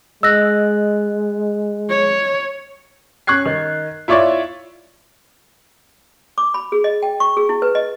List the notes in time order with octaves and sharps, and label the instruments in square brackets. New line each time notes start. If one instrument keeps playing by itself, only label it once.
[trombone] G#3 [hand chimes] D#5 F#6 [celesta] E6 A#6
[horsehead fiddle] C#5
[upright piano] C#4 C#6 F#6 G#6 C7
D#3
E4 F4 C#5 D5 E5 C#6
[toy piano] D6
B5
G#4
D#5
G5
C#6
G#4
E4
B4
D#5